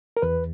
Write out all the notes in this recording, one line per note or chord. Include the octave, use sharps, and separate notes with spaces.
A#4
E2 B4